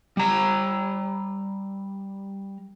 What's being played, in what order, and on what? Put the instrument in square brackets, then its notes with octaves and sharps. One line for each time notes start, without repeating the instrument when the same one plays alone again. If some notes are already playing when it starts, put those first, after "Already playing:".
[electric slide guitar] G3 A#5